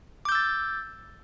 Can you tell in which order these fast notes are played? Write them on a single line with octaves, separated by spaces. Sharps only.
D6 G6 E6 A6